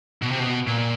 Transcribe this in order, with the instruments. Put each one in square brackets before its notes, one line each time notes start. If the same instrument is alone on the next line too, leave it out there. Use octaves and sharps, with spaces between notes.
[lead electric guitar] B2
C3
B2
A#2